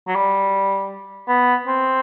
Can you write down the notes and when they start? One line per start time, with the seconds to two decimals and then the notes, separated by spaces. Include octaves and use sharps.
0.08 F#3
0.16 G3
1.29 B3
1.67 C4